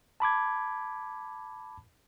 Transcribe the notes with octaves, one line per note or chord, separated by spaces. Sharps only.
A5 B5 D6 G#6